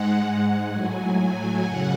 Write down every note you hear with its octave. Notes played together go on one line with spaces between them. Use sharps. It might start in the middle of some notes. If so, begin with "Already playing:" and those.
Already playing: G#2 G#3 F#5
A2 F#3 G#5
F#2 C#3 F#5